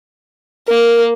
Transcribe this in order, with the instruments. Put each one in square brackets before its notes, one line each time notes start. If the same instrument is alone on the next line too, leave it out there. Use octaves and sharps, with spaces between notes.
[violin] A#3 [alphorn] A#4